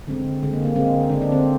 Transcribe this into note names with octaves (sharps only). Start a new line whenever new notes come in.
D3 G#3 C4
D3 G#3
A#3
A#3
D3 G#3 C4
D3 G#3 D4
D4
C4